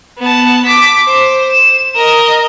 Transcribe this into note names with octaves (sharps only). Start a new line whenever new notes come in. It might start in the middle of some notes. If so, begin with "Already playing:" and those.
B3 A5
D6 B6
C5
E7
A#4 D#5